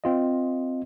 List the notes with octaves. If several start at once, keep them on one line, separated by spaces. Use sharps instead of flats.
C4 F4 D#5